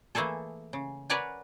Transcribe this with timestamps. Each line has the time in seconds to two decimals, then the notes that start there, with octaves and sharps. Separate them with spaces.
0.15 E3 A3 A#3 G#4 A4
0.73 C#3
1.10 A#4 B4 C#5 D5 F#5 G#5